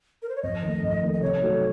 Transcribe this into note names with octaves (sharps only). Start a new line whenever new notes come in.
A#4
C5
C#5
F2 D#5
D#3 A3
F2
D#3 A3
D#5
C3 C#5
F#3 A3 D#4 A4